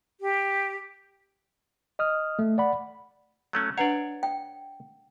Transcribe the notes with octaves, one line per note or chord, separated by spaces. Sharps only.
G4
D#5 D#6 F6
A3
D5 F#5 B5
F#3 A3 C#4
D4 B4 C#5 D5 F#5 A#5
G5